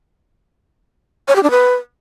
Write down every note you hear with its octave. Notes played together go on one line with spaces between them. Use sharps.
C#5
G4
D4
B4